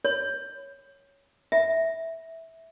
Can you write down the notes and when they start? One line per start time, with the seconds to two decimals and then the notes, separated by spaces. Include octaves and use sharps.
0.05 C#5
1.52 E5